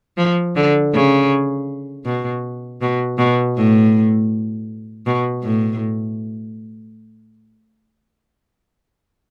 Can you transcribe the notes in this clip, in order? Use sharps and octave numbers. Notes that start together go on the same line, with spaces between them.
F3
D3
C#3
B2
B2
B2
A2
B2
A2